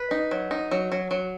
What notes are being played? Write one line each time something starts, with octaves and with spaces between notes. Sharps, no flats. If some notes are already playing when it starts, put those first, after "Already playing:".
Already playing: B4
D#4
F#3
D#4
F#3
F#3
F#3